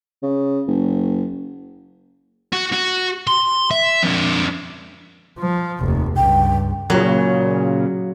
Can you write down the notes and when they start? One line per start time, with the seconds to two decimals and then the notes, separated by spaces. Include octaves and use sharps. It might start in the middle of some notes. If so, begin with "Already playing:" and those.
0.23 C#3
0.67 F#1
2.53 F#4
2.73 F#4
3.27 C6
3.71 E5
4.03 F2 D4
5.39 F3
5.80 F1 D#2
6.17 C#2 G2 G5
6.90 A#2 C#3 F#3